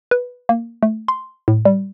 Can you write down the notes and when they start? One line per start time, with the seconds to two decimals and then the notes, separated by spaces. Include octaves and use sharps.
0.11 B4
0.49 A#3
0.83 A3
1.08 C6
1.48 A2
1.65 G3